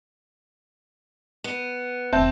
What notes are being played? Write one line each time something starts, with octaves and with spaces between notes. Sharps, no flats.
B3
F1 D#3 C4 E5 A5 G6